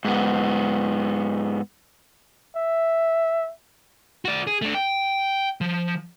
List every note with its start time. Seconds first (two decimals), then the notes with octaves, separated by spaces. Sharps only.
0.05 G#2 B3
2.56 E5
4.25 F#4 D5
4.47 G#4
4.62 A3 D4
4.75 G5
5.61 F3